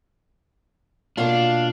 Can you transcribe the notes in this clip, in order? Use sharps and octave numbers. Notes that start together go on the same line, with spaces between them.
B2 A#3 D4 F4 F5 C#6 D6